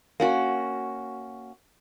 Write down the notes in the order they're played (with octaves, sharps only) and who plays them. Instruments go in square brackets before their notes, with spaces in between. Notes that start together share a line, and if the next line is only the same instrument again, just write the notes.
[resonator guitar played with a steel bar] A#3 C#4 F#4